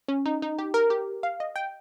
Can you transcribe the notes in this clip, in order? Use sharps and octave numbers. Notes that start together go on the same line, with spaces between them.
C#4
D#4
D#4
G4
A#4
G4
F5
D#5
G5